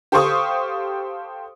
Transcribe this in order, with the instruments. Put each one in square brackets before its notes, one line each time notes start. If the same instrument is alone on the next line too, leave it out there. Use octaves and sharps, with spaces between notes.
[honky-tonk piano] G4 A4 C5 F5 C#6 D#6